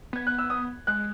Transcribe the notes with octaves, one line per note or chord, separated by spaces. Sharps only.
B3 G#6
F#6
E6
D#6
G#3 F#6